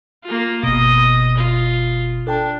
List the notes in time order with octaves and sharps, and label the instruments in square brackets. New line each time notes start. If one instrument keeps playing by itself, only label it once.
[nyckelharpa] A#3 F4
[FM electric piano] G1 B2 [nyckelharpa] D#5
[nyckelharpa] F4
[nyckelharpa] D4 [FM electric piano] A4 G5 A5